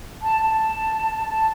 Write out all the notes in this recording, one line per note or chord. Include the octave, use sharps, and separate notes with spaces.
A5
A5
A5